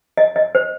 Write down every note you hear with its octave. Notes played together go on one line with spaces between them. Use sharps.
D#5
D#5
C5